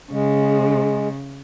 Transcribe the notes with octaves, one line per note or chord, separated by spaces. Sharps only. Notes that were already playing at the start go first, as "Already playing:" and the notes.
C#3 G#3